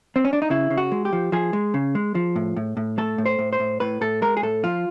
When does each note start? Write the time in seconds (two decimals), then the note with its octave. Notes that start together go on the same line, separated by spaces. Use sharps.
0.16 C4
0.25 C#4
0.33 D4
0.42 D#4
0.50 C#3 E4
0.70 C#3
0.77 F#4
0.92 G#3
1.05 G4
1.13 F3
1.32 F3 G#4
1.53 G#3
1.74 C#3
1.95 G#3
2.15 F3
2.36 A2
2.57 A2
2.77 A2
2.98 A3 A4
3.18 A2
3.26 C5
3.39 A2
3.53 C5
3.60 A2
3.80 A2 B4
4.01 A2 A4
4.22 G#3 A#4
4.37 G#4
4.42 A2 A4
4.63 F3 F4